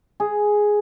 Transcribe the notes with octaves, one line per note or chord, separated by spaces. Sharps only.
G#4